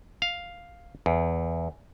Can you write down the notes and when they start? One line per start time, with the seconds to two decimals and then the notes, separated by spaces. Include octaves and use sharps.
0.22 F5
1.06 E2